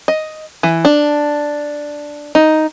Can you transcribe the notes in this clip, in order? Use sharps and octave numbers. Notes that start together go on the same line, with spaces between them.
D#5
E3
D4
D#4